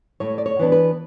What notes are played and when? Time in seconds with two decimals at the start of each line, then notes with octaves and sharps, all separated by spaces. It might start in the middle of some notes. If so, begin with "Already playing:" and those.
0.20 A2 C#5
0.38 D5
0.46 C#5
0.59 E3 B3 D4
0.72 B4